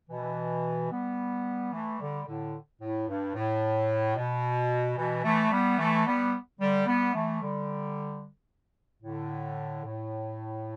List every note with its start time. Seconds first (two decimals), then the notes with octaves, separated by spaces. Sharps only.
0.10 B2 E3
0.91 G3 B3
1.72 E3 A3
1.99 D3 G3
2.26 A2 D3
2.81 A2
3.08 G2
3.35 A2
4.16 B2
4.97 B2 E3
5.24 E3 A3
5.51 G3 B3
5.78 E3 A3
6.06 G3 B3
6.60 D3 G3
6.86 G3 B3
7.13 E3 A3
7.41 D3 G3
9.03 A2 D3
9.84 A2